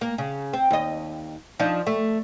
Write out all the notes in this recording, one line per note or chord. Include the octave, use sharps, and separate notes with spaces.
A#3
C#3
C4
D#2 D#5
F3 D4 D#4
A3